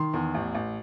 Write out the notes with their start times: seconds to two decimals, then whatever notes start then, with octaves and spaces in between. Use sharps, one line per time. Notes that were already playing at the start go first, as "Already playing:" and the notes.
Already playing: D#3 C6
0.13 E2
0.34 A1
0.54 A1